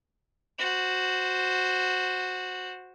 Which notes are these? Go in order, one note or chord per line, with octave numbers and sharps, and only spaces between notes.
F#4 C5